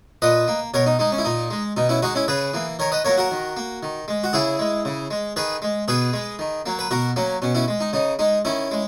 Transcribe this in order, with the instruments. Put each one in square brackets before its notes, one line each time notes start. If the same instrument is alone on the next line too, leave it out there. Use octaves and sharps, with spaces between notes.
[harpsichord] A#2 B4 D#5
A#3
B2 A#4 C#5
D#4
G#3 D#4
C#4
E4
A#2 D#4
G#3
B2 D#4
C#4 E4
G#3 D#4 F#4
C#4 E4
C#3 G#4 B4
E3 A#3
D#3 A#4 C#5
B4 D#5
F#3 A#3 A#4 C#5
F#4 A#4
D#3
A#3
D#3
G#3
F#4
C#3 E4 G#4
G#3
C#3
G#3
D#3 G#4 B4
G#3
B2 G#4 B4
G#3
D#3
F#3 A#3
B4
B2 F#4 A#4
F#3 A#3 C#4
B2 C#4
C#4 E4
G#3
D#4
C#3 D#4
G#3 D#4
D#3 C#4 E4
G#3